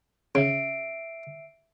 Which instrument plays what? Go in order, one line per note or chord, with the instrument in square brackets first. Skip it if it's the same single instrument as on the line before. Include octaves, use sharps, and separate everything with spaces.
[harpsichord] C#3 [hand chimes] E5 C7 D7